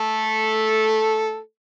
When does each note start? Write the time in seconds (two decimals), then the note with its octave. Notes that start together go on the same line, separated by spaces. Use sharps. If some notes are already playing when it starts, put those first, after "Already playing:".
Already playing: A3 A4